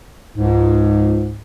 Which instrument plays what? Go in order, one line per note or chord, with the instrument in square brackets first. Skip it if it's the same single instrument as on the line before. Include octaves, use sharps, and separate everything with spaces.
[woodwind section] C#2 G#2